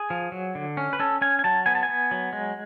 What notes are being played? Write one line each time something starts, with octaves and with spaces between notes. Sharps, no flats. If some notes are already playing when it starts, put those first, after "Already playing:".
Already playing: G#4
F3
F#3
D3
C#4
B4
C#4 A4
C#4 G#5
G#5
F#3 A5
B3 G#5
A5
G#5
B3
F#3
G#3